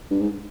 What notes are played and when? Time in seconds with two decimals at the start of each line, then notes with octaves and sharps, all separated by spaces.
0.10 G2
0.21 G#2